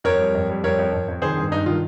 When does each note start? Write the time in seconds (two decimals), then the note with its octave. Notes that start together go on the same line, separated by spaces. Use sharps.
0.04 F2 A#4 C#5
0.19 G3
0.35 F2
0.49 G3
0.64 F2 A#4 C#5
0.79 F2
0.93 F2
1.08 F2
1.22 D#3 G#4 C5
1.38 G2
1.51 G2 D#4
1.66 D#3 F4